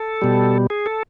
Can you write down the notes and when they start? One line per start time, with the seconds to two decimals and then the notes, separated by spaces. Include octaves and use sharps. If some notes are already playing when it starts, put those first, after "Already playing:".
Already playing: A4
0.22 B2 G3
0.70 G#4
0.86 A4